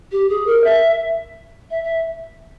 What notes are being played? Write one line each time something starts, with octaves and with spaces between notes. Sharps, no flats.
G4
G#4
A#4
E5
E5
E5